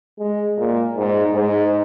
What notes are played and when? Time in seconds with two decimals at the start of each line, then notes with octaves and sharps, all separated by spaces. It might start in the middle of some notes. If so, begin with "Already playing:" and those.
0.19 G#3
0.58 A#2
0.97 G#2
1.34 G#2